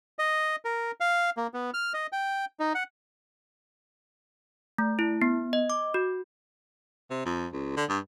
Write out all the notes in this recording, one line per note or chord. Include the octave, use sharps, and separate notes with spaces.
D#5
A#4
F5
A#3
B3
F6
D#5
G5
D#4
F#5
A3
E4
B3
D#5
D6
F#4
C3
F2
C#2
D3
G2